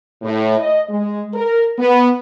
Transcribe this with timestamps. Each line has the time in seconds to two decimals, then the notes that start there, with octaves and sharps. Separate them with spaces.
0.22 A2
0.59 D#5
0.89 G#3
1.34 A#4
1.78 B3